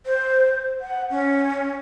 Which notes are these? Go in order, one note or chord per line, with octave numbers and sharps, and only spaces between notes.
C5
F#5
C#4